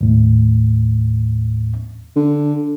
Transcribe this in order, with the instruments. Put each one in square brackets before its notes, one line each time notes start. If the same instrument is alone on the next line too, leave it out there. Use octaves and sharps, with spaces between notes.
[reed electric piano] D#2 A2
[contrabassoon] D3